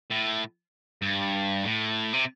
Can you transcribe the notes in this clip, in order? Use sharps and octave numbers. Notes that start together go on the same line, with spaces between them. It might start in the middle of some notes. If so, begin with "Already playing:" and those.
A2
G2
A2
C3